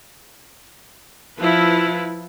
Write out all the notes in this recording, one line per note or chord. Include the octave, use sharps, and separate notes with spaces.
F3 E4 F4 B4